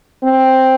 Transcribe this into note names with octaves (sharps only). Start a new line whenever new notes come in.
C4